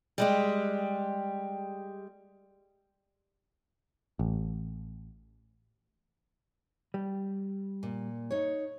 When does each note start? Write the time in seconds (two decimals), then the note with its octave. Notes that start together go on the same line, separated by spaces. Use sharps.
0.18 G3 G#3 G4
4.19 A1
6.94 G3
7.83 A#2
8.31 D#4 C#5